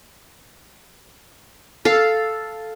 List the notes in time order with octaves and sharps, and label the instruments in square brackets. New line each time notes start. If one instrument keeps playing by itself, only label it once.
[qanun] A4 F5